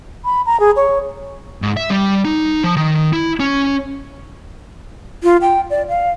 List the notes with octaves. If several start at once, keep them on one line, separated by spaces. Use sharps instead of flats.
B5
A#5
G#4
C#5
G#2
E5
G3
D#4
F3
D#3
E4
C#4
F4
G5
D5
F5